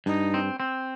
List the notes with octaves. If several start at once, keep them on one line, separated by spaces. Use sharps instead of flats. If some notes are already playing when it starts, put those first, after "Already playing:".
G2 D#4
C4
C4